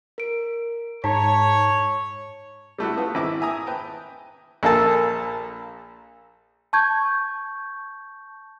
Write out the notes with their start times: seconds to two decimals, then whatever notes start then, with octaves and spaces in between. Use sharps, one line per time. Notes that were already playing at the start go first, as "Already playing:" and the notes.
0.18 A#4 D7
1.04 G#2 C#5 A5 A#5 B6
2.78 G3 A3 E4 F#4
2.97 A3 B3 F4
3.15 G#1 E4 D6
3.40 E4 E5 G#5 A#5 D#6
3.66 B4 G5 A5
4.63 A#1 A#3 A4 A5
6.73 A5 C#6 G6 G#6